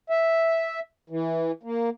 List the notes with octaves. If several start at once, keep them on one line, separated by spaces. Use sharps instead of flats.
E5
E3
A#3